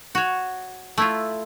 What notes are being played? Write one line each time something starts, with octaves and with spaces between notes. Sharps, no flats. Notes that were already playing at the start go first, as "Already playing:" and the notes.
F#4 C#5
A3 E4 F4